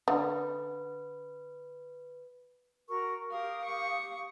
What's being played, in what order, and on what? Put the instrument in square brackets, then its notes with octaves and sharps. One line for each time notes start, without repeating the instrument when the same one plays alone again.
[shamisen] D3 [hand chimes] B4
[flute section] F#4 A#4 C#6
[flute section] G4 F5 D#6 [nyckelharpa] A#4
[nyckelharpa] C#6